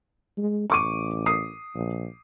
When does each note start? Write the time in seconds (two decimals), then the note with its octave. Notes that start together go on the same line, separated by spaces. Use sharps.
0.38 G#3
0.70 A1 C#6 D6 D#7
1.26 D#6 C7
1.75 A#1